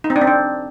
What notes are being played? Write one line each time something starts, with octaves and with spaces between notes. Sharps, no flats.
D#4
C4
D4
C4
D4